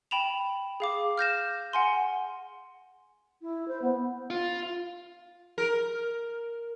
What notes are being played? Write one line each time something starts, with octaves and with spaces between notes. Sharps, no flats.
G5 B5 E7 F7
G#4 F5 D6
F6 G6 A#6 E7
F#5 G#5 C6
E4
C5
B3
F4
A#4